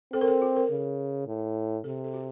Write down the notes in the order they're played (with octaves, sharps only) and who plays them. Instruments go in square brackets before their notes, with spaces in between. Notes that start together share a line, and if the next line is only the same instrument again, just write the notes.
[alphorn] C4 [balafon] A4
[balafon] A#4
A4
F#4
A#4
[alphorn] C#3
A2
[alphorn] C3 [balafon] A4
[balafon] A4
F#4